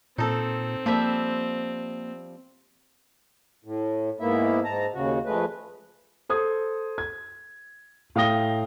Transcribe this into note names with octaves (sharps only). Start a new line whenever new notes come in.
A#2 C4 D#4 A4
F3 G3 A#3 E5
A2
G#2 A#3 B3 E4 E5
G#2 A5 A#5
D#2 C#3 F#4
F2 G#3 A3 B4
A4 C5 D#6 G#6
G#6
A2 F5 G5 D#6 A#6 G7